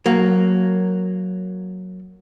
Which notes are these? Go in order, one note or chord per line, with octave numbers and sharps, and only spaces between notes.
F#3 A#3